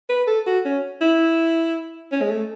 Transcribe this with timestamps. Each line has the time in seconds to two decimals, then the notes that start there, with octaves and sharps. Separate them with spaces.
0.09 B4
0.27 A4
0.47 F#4
0.65 C#4
1.01 E4
2.12 C#4
2.22 G#3
2.31 A3